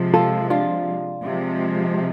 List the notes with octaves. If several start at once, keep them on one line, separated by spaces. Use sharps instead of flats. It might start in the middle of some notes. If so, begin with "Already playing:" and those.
Already playing: C3 F3 G#3
F4 A4
D4 F4
C3 F3 G#3